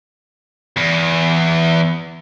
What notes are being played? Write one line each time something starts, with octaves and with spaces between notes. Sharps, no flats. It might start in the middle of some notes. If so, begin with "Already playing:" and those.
E2